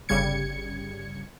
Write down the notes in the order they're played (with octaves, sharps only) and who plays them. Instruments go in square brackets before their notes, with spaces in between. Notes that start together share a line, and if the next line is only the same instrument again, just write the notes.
[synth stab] G1 C#3 G3 G#6 C#7